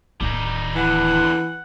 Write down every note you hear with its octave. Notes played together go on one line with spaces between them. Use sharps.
D1 D#2 G3 D#4
E2 D3 E3 F#5